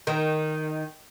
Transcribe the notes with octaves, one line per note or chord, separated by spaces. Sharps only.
D#3